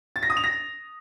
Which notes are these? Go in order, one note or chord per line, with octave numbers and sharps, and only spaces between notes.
A6
A#6
D#6
F7
A#6